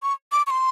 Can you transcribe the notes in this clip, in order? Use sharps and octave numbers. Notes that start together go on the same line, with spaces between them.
C#6
D6
C#6
C6